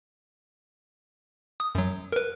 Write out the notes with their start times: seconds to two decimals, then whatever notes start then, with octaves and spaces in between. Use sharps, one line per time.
1.60 D#6
1.75 F#2 F#3
2.12 A#4 B4